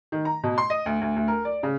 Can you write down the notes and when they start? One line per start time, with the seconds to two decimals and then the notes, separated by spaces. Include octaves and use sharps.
0.12 D#3
0.25 A#5
0.43 B2
0.58 C6
0.70 D#5
0.86 D2
1.01 D2
1.16 D2
1.28 A#4
1.45 D5
1.63 C#3